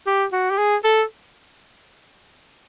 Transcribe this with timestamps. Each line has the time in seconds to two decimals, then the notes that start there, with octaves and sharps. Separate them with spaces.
0.07 G4
0.32 F#4
0.51 G4
0.58 G#4
0.84 A4